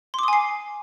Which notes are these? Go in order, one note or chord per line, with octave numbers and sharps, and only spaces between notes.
G#5 C6 D6 D#6 C7